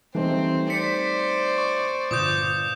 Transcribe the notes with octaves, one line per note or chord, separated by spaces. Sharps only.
E3 G3 A3 C4 D#4
C5 D5 B6 C#7
C#6
G1 A#2 D6 D#6 G6